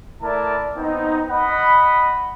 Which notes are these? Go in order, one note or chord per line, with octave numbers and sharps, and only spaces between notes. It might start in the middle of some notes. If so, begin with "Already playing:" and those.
A3 E4 A#4 D5 A5
B3 C4 D#4
D#5 F#5 B5